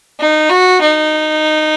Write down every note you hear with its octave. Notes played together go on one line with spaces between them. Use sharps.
D#4
F#4
D#4